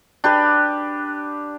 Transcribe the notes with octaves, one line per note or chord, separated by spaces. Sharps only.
D4 G4 B4